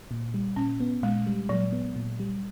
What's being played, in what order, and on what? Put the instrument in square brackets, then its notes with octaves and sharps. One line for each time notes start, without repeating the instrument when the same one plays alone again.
[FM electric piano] A#2
G3
[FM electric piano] A#2 [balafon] C#4
[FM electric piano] B3
[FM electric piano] A#2 [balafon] G#3
[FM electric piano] G3
[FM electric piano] A#2 [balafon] F#3
[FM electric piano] B3
A#2
G3